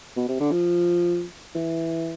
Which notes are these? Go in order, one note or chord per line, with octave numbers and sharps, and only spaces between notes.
B2
C3
D3
F3
E3